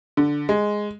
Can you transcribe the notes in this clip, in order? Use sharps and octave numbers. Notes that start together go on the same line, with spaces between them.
D3
G#3